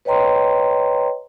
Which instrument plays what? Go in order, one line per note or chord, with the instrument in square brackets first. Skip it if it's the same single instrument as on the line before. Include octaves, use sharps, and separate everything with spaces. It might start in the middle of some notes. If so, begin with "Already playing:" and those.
[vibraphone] B4 C#5 D#5 G5 A#5 C6